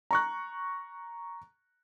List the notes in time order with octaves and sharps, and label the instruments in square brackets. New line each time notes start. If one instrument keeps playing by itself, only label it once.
[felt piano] A#5 C#6 F#6